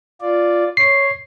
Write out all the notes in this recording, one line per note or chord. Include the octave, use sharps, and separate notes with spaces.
F4 D5
C#5 C7